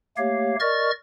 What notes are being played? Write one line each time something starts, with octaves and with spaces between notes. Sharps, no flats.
A3 A#3 G4 C#5 F5
A#4 D5 D#5 C#6 F6 A6